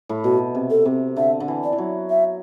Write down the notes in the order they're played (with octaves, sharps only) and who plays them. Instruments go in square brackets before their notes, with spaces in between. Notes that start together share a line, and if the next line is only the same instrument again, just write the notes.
[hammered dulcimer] A2
[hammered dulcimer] B2 [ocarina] F#4
[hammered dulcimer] C3
[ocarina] A4
[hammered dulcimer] C3
[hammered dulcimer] D3 [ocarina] E5
[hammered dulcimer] D3
E3
[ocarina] D5
[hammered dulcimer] E3
F#3
[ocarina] E5